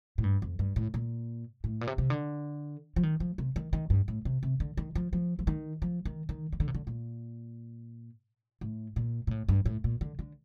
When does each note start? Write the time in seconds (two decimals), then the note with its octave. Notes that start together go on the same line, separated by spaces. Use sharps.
0.18 A2
0.24 G2
0.42 F2
0.59 G2
0.76 A2
0.94 A#2
1.64 A2
1.81 A#2
1.87 C3
1.98 C3
2.10 D3
2.96 F3
3.03 D#3
3.20 F3
3.38 C3
3.56 D#3
3.73 D#3
3.90 G2
4.08 A2
4.25 C3
4.43 C3
4.60 D3
4.77 D#3
4.95 F3
5.13 F3
5.39 F3
5.47 D#3
5.82 F3
6.05 D#3
6.29 D#3
6.52 D#3
6.60 D3
6.68 C3
6.75 D3
6.87 A#2
8.61 A2
8.96 A#2
9.27 A#2
9.31 A2
9.49 G2
9.66 A2
9.84 A#2
10.01 D3
10.19 D3